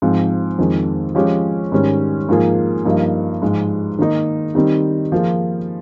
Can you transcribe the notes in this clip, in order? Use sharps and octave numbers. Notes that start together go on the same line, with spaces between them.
G#2 F3 C4
F2 D#3 G#3
F3 G#3 C#4 G4
G#2 D#3 G3 C#4
G#2 F3 A#3 F4 G#4
G2 F3 A#3 D#4
G#2 F3 G#3
D#3 A#3 D#4
D#3 G3 C4 D#4
F3 A#3 F4 G#4